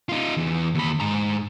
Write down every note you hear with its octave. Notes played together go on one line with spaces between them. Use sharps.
D#4 F4
E2
D#2 B5
G#2 A#5